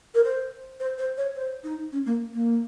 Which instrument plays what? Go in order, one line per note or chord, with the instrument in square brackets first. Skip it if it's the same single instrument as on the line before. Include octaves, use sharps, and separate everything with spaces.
[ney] A#4
C5
C5
C5
C#5
C5
D#4
C#4
A#3
A#3